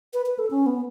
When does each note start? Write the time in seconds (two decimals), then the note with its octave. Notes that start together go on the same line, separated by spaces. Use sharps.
0.14 B4
0.26 B4
0.39 A4
0.51 C#4
0.66 B3